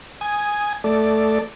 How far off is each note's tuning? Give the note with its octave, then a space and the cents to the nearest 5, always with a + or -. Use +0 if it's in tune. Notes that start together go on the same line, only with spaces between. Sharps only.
G#5 +0 D#6 +0
A3 +0 A4 +0 D5 +0